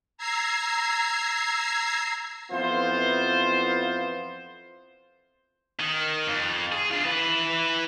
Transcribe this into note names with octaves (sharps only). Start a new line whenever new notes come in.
A#5 E6 G#6 C7
F2 E3 B3 F4 C5
D#3
F2
G#4
D4 F4
E4 B4